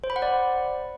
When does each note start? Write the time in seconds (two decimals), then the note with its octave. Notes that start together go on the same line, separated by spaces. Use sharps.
0.04 C5
0.10 B5
0.16 F#5
0.22 D5